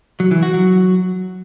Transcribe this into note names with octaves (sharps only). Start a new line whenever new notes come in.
F#3
E3
F#4
F#3